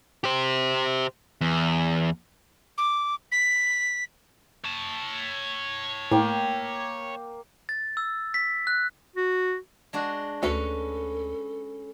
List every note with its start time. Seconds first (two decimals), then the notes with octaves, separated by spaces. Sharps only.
0.24 G4 C5
1.41 E2
2.78 D6
3.32 B6
4.65 C#5 A5
6.11 A2 A#3 G5
7.69 A6
7.97 E6
8.34 B6
8.67 F#6
9.16 F#4
9.93 G#3 D4 F#4
10.43 D2 C#4 A4 B4